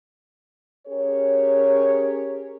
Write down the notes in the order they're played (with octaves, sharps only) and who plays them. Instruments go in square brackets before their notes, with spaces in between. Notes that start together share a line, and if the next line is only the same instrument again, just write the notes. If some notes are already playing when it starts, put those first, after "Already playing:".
[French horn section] C#4 G4 G#4 A#4 C#5